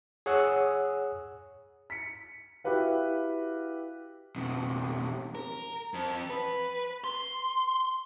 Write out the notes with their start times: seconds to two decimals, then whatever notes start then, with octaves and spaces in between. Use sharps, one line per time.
0.26 G#4 C#5 F#5 D#6 E6
1.90 B6 C#7
2.64 E4 F#4 G4 B4 F5
4.36 F2 B2
5.35 A#4
5.94 F2
6.30 B4
7.04 C6